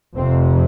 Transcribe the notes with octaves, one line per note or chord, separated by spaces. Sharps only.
F1 F2 C3 C4